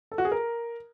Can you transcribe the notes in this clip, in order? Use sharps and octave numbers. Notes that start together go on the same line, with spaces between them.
A4
F#4
G#4
A#4